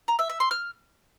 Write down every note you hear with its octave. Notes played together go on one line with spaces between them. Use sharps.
A#5
E5
E5
C6
F6